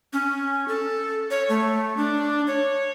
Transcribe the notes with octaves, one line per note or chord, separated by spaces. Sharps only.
C#4
A4
C#5
A3
D4
C#5